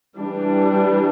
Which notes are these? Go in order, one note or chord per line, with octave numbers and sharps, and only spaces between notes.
E3 G3 D4